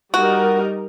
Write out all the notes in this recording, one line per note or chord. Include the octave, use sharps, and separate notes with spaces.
G3 D#4 F#4 A#4